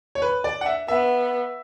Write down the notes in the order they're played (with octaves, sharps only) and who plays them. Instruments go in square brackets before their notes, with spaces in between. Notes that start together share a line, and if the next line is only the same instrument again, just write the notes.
[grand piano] C#5
B4
D5
F#5
E5
[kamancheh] B3 [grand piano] E5